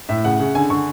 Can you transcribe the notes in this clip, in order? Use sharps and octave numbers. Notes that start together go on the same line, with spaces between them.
A2 E5
C#3 F#5
C#3
D3 G#5
D3 C#6